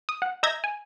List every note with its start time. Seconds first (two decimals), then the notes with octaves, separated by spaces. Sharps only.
0.09 D#6
0.22 F#5
0.43 D#5 E5 A#5 G6 G#6 A#6
0.64 G#5